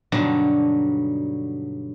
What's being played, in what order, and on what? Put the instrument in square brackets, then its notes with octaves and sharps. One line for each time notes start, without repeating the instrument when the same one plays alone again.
[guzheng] G2 B2 D3 F#3 D4 D#4